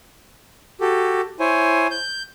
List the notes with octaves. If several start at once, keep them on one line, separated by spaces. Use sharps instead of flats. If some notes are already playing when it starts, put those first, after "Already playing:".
F#4 G4 A4
E4 C5 C#5 G#5
G6